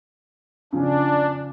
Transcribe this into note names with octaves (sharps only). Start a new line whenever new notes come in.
C#3 F3 C#4 D4